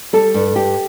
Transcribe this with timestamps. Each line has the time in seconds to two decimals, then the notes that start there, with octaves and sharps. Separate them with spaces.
0.13 G3 A4
0.34 G2
0.56 G2 G4